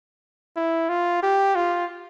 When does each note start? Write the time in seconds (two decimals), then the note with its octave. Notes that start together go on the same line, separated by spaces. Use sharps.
0.56 E4
0.89 F4
1.23 G4
1.55 F4